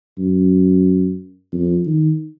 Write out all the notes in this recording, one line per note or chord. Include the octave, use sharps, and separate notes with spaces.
F#2
F2
D#3